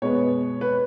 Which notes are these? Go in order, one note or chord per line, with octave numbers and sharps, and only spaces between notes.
B2 G#3 B3 C#5
B4